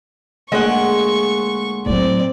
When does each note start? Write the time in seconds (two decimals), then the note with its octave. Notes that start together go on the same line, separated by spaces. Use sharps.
0.52 D2 A#2 G#3 F#5 C#6
1.86 A2 F#3 C4 D5